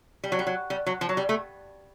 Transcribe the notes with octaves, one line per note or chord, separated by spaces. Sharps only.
G3
F#3
G3
F#3
G3
F#3
F3
F#3
G3
A3